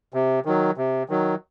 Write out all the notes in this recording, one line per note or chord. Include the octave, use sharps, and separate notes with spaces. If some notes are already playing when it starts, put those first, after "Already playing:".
C3
D#3 F#3
C3
D#3 F#3